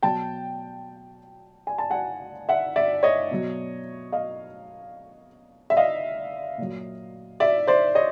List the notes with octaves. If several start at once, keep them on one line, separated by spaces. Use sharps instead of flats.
B2 F#3 G5 A5
G#5
A5
F#5 G#5
E5 F#5
D5 E5
C#5 D#5
B2 F#3
D#5 F5
E5
D#5 F5
A#2 F#3
D5 E5
C5 D5
C#5 D#5